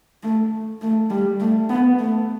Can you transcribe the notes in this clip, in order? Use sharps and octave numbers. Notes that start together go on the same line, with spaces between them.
A3
A3
G3
A3
B3
A3